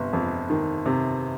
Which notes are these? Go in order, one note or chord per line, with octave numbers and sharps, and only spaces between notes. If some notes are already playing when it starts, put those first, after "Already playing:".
Already playing: G1 C3
F2
D#3
C3